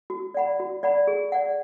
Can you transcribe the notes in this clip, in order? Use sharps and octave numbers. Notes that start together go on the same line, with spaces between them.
F#4
D5 F#5 B5
F#4
D5 F#5 B5
G#4
D5 F#5